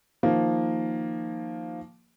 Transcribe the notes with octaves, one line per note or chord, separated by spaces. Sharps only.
D#3 F3 A#3